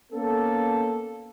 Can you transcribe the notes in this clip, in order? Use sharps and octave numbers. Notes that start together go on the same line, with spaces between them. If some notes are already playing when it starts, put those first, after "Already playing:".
A#3 B3 C#4 A4